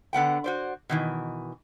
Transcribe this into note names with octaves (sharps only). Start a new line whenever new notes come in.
D3 B3 F#5 G5
F#4 C5 D5
B2 D#3 E3